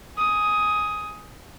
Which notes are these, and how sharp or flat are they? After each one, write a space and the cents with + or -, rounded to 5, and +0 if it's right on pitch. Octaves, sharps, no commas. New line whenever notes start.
G#5 +0 D#6 +10